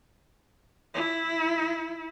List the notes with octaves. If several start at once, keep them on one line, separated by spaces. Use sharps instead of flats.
E4